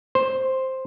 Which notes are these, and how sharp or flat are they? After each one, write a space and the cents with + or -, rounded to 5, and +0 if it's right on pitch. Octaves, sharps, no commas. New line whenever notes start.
C5 +5